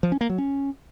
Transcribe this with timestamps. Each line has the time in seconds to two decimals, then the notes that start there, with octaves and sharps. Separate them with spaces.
0.03 F3
0.12 C#4
0.21 A#3
0.30 F#3
0.38 C#4